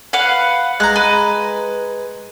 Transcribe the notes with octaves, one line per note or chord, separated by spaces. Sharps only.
B4 F5 F#5
G#3 A#5 F#6
B4